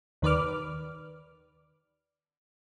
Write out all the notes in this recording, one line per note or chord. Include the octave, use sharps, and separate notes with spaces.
D#2 D#3 B4 D5 D6 F6